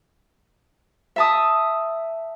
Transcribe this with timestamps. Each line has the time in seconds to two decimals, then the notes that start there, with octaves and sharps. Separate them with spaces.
1.16 E5 A5 D#6